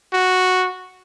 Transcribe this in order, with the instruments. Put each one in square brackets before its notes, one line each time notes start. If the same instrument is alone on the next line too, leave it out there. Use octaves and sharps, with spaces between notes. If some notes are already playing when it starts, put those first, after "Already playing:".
[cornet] F#4